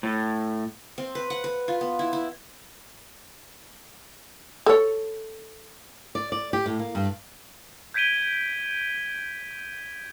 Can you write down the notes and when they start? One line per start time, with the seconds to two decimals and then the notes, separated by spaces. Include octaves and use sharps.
0.03 A2
0.98 C4
1.15 B4
1.30 F#5
1.44 B4
1.68 F4
1.81 B3
1.99 E4
2.13 E4
4.66 A4 C#5
6.15 D5
6.32 D5
6.53 G4
6.66 A2
6.79 A#3
6.95 G2
7.94 G6 G#6 B6 D7 D#7 G7